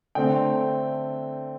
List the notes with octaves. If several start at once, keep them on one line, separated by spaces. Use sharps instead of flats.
D3 A3 C4 G5